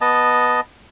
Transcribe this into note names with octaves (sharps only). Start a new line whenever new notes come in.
B3 D#5 A5